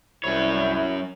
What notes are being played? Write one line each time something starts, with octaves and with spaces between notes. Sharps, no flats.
C2 F#2 E4 C#5